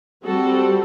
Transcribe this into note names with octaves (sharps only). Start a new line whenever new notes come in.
G3 C4 F#4 A4